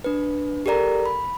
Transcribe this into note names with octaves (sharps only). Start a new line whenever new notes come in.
D4 B4
G4 A4 A#4 D5 A#5
B5